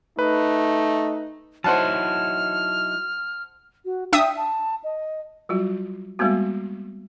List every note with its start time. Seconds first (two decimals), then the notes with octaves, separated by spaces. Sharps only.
0.19 A3 D#4 B4
1.64 F#3 D#4 E4 C5 F#5 A5 F6
3.85 F#4
4.13 D4 E5 G5 D#6
4.37 A5
4.84 D#5
5.49 F#3 G3 F4 F#4
6.19 G3 G#3 A#3 B3 F#4